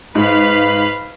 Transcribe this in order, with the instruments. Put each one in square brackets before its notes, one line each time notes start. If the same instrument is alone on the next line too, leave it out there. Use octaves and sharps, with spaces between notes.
[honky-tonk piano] G#2 [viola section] B4 F5 B5